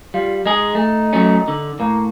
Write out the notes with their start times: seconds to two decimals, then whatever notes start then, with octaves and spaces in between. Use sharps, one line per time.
0.14 G3 F4
0.46 G#3 D#4 G#4
0.75 A3
1.13 F#3 A3 C#4
1.48 D3
1.80 A2 A#3